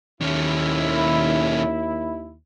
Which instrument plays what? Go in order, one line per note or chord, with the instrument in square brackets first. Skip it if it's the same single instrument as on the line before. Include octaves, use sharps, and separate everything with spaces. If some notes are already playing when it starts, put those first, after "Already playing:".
[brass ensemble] D#2 E4 [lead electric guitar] D#3 C#4